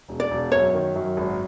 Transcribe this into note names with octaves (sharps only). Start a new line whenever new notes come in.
E1
D5
E1
F#2 C#5
D#3
F#2
G#1